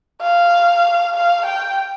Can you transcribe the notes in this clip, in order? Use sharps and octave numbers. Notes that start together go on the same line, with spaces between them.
F5
F5
G5